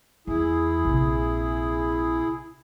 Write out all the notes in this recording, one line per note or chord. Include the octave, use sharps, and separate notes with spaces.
E2 E4 G#4
A#1 C3